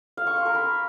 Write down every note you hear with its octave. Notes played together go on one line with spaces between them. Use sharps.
F5
C#6
C6
A#4
B5